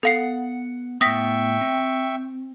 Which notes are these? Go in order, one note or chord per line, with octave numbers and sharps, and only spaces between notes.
B3 A4 F5 F#5 C7
A2 B3 E5 G5 C#6 D#6 A#6 B6
C4